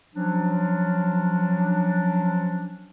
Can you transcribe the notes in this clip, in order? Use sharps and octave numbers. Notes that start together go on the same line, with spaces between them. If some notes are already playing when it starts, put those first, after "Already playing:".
F3 F#3 C#4 D4